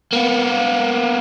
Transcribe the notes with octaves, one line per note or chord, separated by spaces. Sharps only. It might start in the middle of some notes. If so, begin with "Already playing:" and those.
A#3 B3